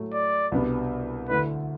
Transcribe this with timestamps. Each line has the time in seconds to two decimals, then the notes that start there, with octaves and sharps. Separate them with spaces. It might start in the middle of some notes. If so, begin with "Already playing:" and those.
Already playing: A2 F#3 A3
0.13 D5
0.52 C2 B2 G3 B3 D4
1.29 D2 D3 A3 E4 B4